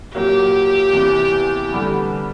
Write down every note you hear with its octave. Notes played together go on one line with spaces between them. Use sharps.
A#2 F#3 A#3 G4
E2 C3 E3
D3 G3 B3